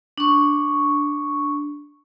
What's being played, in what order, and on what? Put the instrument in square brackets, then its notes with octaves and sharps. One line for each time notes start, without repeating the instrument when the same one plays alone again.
[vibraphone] D4 C#6